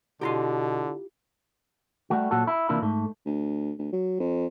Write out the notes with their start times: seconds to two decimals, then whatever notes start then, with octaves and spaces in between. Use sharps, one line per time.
0.21 B2 D3 E4 F4 G4 A#5 C6
2.10 G3 A3 F#4
2.31 A#2 F#3 F#4 A4
2.47 E4
2.69 C3 E3 A#3 D4 E4 F4
2.82 G#2 A3
3.25 D2
3.78 D2
3.92 F#3
4.20 F2